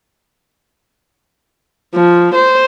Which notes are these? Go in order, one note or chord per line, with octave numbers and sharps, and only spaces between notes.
F3
C5